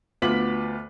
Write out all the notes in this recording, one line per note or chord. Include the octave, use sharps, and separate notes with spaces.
D2 B3 F4 D6 B6 F#7